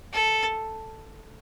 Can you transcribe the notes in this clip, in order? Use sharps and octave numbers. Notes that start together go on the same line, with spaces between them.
A4